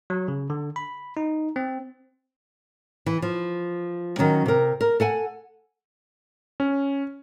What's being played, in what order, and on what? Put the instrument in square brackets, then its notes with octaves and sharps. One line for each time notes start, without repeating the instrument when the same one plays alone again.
[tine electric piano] F#3
C#3
D3
B5
D#4
C4
[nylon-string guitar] E3
F3
D#3 F#3 C#4
C3 A#4
A#4
A4 F#5 G#5
[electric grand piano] C#4